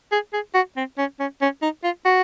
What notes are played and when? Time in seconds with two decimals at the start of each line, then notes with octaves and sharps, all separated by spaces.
0.12 G#4
0.33 G#4
0.54 F#4
0.77 C4
0.98 C#4
1.20 C#4
1.41 C#4
1.62 D#4
1.84 F4
2.05 F#4